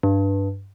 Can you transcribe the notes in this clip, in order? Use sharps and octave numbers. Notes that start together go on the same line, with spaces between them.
G2